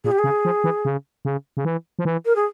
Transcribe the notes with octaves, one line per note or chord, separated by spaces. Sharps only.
A#2 G#4
G4
G#4
C#3
F3
E3
C#3
C#3
C#3
E3
F3
E3
A#4
G#4